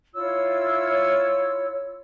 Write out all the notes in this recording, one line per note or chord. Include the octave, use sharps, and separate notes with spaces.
E4 F4 C#5 E6